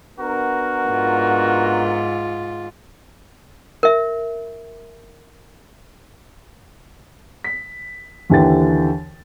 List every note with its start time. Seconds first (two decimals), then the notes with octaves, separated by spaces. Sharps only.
0.19 B3 D4 F#4 A#4
0.89 G#2 F4
3.83 A#4 E5
7.44 B6
8.30 D#2 D3 E3 G4 G5 A6